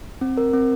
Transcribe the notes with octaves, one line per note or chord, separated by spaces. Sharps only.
C4
A#4
C4